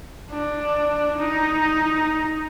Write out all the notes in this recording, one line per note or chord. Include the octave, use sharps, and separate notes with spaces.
D4
D#4